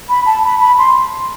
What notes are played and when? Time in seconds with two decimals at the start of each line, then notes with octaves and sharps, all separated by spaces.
0.09 B5
0.26 A5
0.44 B5
0.60 B5
0.78 C6